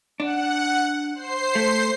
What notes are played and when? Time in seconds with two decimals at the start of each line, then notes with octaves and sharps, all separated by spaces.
0.20 D4 F#5
1.15 C5 C7
1.55 A3